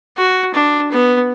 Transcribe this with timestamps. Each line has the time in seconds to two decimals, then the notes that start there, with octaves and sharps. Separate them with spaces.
0.17 F#4
0.54 D4
0.92 B3